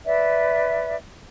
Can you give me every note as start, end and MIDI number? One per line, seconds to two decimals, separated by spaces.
0.05 0.94 71
0.05 0.94 74
0.05 0.94 76